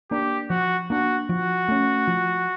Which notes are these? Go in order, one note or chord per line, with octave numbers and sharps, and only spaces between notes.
A#3 D4 G4
F3 F#4
A#3 D4 F#4
F3 F#4
A3 C#4
F3